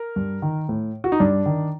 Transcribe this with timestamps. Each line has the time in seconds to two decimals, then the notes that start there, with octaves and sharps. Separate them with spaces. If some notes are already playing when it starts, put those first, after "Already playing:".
Already playing: A#4
0.16 G2
0.42 D#3
0.69 A2
1.04 F#4
1.12 D#4
1.20 G2 D4
1.46 D#3